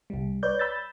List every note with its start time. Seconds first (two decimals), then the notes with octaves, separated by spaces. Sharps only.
0.10 C2 G3
0.43 B4 C#5 D5 G6
0.59 B5 E6 G6 A6